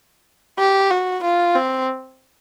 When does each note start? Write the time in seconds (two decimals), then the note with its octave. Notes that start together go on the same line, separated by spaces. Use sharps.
0.59 G4
0.91 F#4
1.23 F4
1.55 C4